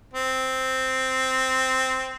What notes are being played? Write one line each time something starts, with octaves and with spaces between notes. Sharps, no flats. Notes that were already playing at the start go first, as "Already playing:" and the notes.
C4